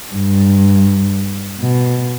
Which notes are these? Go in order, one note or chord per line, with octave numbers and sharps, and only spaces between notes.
G2
B2